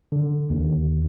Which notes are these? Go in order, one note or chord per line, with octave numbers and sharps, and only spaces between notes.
D3
D#2